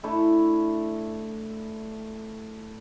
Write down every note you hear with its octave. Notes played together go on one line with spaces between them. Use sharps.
A3 D4 E4